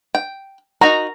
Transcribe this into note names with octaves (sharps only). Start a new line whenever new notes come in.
G5
D#4 F#4 A#5